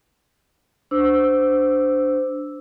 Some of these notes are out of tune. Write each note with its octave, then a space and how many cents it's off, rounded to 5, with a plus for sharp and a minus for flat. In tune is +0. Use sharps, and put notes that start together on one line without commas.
D4 +0 C5 -20 E6 +0